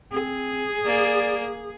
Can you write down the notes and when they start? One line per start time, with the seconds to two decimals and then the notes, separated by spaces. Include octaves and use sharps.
0.12 C4 G#4
0.85 A#3 D5